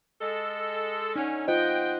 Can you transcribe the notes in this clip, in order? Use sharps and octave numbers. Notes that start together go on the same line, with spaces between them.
G#3 A4
D3 C#4 D#4
B3 F4 C5 D#5 F#5 G5